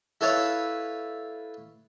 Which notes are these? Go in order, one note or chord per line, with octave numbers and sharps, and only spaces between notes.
E4 A4 B4 C#5 E5 F5